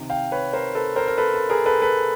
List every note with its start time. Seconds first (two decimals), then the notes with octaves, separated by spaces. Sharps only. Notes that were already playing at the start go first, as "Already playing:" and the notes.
Already playing: C3 D#3
0.10 F5 G5
0.32 B4 C#5
0.53 A#4 C5
0.75 A4 B4
0.96 A#4 C5
1.08 A#4
1.18 A4 B4
1.34 A4
1.50 G#4 A#4
1.66 A4 B4
1.82 A4 B4